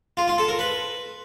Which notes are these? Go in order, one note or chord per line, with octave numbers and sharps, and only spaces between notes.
F4
F4
A4
A#4
B4